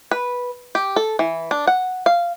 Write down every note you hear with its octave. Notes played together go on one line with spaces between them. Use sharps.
B4
G4
A4
E3
D4
F#5
F5